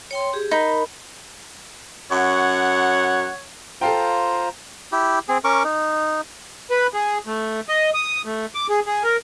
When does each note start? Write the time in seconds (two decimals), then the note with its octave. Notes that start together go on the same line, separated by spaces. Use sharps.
0.11 C#5 G5 C6
0.33 G4 G#4
0.51 D#4 A#4 B5
2.11 F#2 C#5 F#5
3.81 F4 A4 C5 F5 G5 A#5
4.92 E4 G4
5.29 C4 G#4
5.44 C#4 A#4 C#6 D6
5.64 D#4
6.71 B4
6.94 G#4
7.27 A3
7.69 D#5
7.94 D#6
8.25 A3
8.55 D6
8.70 G#4
8.87 G#4
9.04 A#4